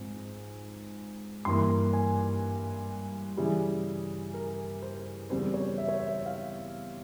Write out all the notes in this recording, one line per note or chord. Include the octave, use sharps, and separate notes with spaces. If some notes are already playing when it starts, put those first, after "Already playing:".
Already playing: G#2 F3 C4
G2 E3 A#3 C6
G#5
C#3 E3 G3 G#4
A#4
C5
E2 C#3 G3 C4 C5
C#5
E5
C#5
E5
F5